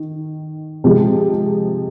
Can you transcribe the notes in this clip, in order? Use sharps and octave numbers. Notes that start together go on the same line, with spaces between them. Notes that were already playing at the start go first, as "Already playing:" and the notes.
Already playing: D#3
C3 F3 G#3